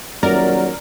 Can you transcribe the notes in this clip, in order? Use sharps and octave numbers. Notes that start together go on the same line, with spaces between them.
D#1 F#3 A#4 D5